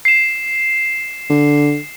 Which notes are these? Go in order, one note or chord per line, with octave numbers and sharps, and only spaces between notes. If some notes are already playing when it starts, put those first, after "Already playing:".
C7 E7
D3